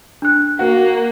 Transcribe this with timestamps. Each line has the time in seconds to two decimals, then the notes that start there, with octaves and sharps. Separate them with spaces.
0.22 D4 F#6
0.59 A#3 F#4